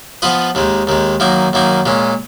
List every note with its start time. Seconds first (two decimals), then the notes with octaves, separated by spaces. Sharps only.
0.22 F3 B3 F4 B4 D#5
0.55 D#2 D#3 G#3
0.87 D#2 D#3 G#3
1.20 F#2 D#3 A#3 D#4
1.53 F#2 D#3 A#3 D#4
1.86 A#2 G#3 C#4